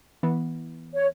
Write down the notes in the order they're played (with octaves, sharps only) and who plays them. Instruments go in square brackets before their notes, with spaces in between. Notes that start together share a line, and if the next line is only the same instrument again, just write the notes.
[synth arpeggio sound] E3 B3
[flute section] C#5